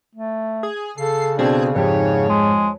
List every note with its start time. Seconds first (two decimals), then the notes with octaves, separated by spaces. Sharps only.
0.15 A3
0.63 G#4
0.98 C#3 A4 C7
1.39 B2 C4 D4 G#4
1.75 F2 G#2 G4 C#5
2.29 G#3